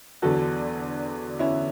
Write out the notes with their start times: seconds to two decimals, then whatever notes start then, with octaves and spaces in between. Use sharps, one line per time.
0.22 E2 D3 F#3 F#4 A4
1.39 C#4 E4